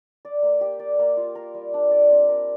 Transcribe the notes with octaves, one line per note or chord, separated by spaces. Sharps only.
D5
A#3
G4
D5
A#3
F4
A#4
G3
D4
D5
C4
A#4